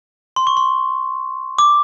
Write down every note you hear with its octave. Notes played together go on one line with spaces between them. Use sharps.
C6
C#6
C6
D6